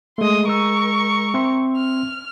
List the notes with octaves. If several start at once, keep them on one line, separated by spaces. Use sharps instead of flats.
G#3 A3 C6 D#6
G#3 A#4 C#6 E6
C4 E5 C6
F6